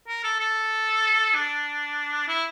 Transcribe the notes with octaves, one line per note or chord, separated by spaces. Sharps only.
A#4
A4
A4
D4
E4